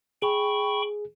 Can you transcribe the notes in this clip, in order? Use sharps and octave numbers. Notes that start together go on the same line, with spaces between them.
G#4 G5 B5 C#6